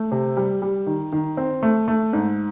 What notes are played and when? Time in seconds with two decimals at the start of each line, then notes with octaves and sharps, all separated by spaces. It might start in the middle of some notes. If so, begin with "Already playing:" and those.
Already playing: A3
0.12 C3
0.37 G3
0.62 G3
0.87 D#3
1.12 D#3
1.37 C4
1.63 A3
1.88 A3
2.13 G#2